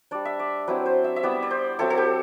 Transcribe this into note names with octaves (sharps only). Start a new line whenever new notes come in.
G3 D4 D5
E5
D5
F#3 C4 E4 B4
C5
E5
E5
G3 B3 E4 D5
D5
C5
F#3 C4 E4 A4
A4
G4